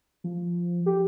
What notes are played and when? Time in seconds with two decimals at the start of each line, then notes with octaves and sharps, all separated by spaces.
0.24 F3
0.86 G4